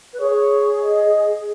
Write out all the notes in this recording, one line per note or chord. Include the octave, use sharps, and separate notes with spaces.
B4
G#4 C#5
D#5